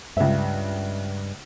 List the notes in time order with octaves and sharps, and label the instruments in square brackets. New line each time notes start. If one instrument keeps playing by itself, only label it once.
[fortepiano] C#2 E5 [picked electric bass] G2